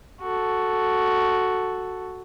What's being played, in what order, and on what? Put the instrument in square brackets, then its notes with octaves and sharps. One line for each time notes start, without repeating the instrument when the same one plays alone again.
[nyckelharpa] F#4 A4